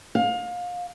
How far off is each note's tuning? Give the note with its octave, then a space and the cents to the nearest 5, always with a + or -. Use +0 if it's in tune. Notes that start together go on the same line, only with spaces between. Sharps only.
F5 +30